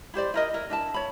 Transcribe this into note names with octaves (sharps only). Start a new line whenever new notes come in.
E4 G4 C5 D5
E4 A#4 D#5
E4 A#4
D4 E4 A5
C#5 B5